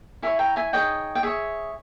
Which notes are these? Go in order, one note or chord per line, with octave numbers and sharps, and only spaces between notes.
E4 A#4 C#5 E5 G#5
G5 A#5
E5 G#5
D#4 G#4 C#5 D#5 G5
G5
G#4 C#5 E5